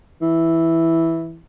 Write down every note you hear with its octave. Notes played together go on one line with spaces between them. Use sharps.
E3